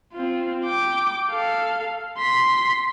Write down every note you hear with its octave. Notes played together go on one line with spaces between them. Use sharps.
C4 F4
G5 D6
A4 F5
C6 B6